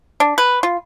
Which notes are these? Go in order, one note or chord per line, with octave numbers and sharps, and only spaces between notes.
D4
B4
F4